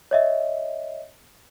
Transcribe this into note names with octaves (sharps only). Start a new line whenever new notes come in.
C#5 D#5 E5